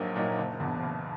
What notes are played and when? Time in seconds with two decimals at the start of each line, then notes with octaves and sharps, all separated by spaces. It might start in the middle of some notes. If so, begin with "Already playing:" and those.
Already playing: A#1 A#2 F#3 A#3 D#4
0.16 A#2 F#3 A#3 D#4
0.38 F#1
0.60 E2 B2
0.82 F#1